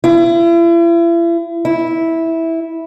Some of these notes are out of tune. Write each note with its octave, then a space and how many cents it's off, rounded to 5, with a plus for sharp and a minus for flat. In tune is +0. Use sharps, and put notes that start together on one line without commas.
E4 +40
E4 -10